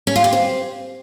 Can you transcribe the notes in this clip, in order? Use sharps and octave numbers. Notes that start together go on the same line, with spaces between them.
C#4
F4
G4
C4